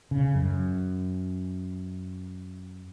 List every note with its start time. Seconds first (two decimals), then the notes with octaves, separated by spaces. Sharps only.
0.11 C#3
0.35 F#2